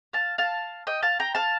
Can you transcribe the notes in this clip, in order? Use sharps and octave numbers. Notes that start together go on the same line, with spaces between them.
F5 A5
F5 A5
D#5 G5
F5 A5
G5 A#5
F5 A5